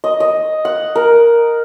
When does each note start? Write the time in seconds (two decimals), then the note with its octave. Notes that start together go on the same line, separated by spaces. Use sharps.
0.04 D#5
0.20 D#5
0.65 F#5
0.96 A#4